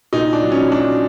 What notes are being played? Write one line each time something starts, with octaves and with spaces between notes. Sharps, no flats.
A#2 D#4
D4
F#3
C#4
F#3 D4